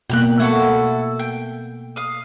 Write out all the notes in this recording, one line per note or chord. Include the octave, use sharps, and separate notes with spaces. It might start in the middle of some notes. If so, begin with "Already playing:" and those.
B2 A#3 G5 F6 F#6
A3 E4 F#4 A4
G5
F5 D#6